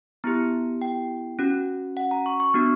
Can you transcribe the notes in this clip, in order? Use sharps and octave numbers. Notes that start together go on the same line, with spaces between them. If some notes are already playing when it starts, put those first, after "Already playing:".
B3 E4 G4 A#5
G5
C#4 F#4
F#5
A#5
C#6
C#6
B3 D4 F#4